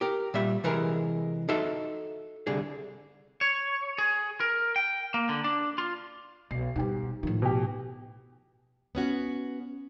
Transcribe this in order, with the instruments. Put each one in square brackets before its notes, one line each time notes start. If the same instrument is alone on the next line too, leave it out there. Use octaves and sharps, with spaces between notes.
[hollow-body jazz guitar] G4 A#4
A#2 G3 E5
C3 E3 G#3 G#4 A#4
D#4 F#4 A4 E5 C6
C2 D3 G#4
[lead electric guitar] C#5
G#4
A#4
G5
A#3
D3
D4
F4
[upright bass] B1 [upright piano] C7
[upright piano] G#2 G4 [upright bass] B2 G3
[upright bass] A2 F3 [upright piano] D#3
[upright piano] B2 G4
[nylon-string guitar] B3 C#4 F#4